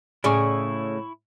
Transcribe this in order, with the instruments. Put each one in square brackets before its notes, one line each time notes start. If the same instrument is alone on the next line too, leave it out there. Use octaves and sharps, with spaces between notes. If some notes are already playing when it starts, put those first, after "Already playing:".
[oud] A2 D5 [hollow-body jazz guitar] C#3 G#4 [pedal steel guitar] E4 C#6